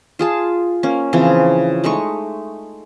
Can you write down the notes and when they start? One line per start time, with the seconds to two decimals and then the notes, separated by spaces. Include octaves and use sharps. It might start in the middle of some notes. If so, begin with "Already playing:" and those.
0.19 F4 G#4 A5
0.83 A#3 C#4
1.13 C#3 E3 F3 C4
1.84 G#3 A3 D#4 C#6